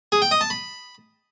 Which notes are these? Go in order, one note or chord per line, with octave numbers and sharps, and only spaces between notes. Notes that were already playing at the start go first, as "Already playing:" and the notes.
G#4
G5
D#5
A5
B5